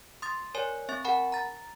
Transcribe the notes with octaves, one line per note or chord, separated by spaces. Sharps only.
C6 D#6 A6
A#4 C#5 D5 G#5
C4 E5 C#6 A6
A#4 F#5 G#5 B5
A#5 A6